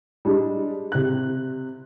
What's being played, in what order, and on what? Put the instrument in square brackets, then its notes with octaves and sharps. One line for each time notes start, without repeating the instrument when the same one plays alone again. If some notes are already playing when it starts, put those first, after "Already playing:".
[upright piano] G3 G#3 D4
C3 F#6